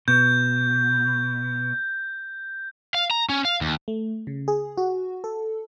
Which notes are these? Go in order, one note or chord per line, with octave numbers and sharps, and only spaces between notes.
B2 G6
F5
A#5
C#4
F5
D#2
A3
C#3
G#4
F#4
A4